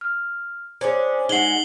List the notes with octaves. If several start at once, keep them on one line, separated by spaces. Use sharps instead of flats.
F6
C#4 D4 G#4 C5
G#3 D#4 F#4 C7 F#7 G7